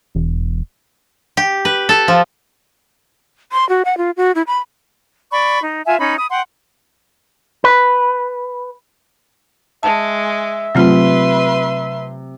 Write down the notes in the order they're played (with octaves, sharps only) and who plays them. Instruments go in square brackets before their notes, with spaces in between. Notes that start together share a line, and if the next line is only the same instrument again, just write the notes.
[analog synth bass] E1
[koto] G4
B4
A4
F3
[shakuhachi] C6
F#4
F#5
F4
F#4
E4
B5
[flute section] D5 B5 C#6
D#4
F4 E5 G#5
C#4 D#4 B5
B5 D#6
F#5 G5 C6
[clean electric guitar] B4
[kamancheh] G#3 [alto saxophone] E5 [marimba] A5
[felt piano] C3 [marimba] F#3 A3 F4 [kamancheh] B4 C6